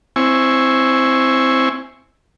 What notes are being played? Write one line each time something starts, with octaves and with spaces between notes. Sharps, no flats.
C4 E4 G#5 C#6